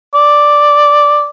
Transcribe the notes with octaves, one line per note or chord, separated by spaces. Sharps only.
D5